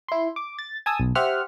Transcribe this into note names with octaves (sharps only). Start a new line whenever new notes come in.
E4 C6
D6
A6
G#5 A5 D#6 E6
B1
G4 C5 E5 F#5 F6